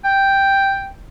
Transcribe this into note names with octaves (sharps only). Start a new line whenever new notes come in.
G5